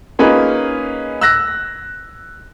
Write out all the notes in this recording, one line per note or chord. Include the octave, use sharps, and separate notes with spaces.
A#3 C#4 D#4 F4 G#4 B4
E6 F#6 A#6